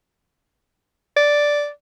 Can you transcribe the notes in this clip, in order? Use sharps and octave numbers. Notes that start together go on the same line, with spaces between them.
D5